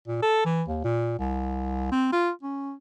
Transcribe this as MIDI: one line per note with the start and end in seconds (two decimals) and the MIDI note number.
0.07 0.19 46
0.22 0.44 69
0.45 0.63 52
0.68 0.79 39
0.84 1.15 46
1.19 1.89 36
1.91 2.12 60
2.12 2.31 65
2.43 2.73 61